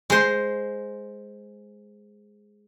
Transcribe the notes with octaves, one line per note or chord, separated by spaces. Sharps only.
G#3 C5